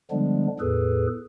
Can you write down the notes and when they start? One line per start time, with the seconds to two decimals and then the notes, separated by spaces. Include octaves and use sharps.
0.11 D3 F3 G3 G#3 B3 D4
0.60 E2 A2 G#4 A4 B4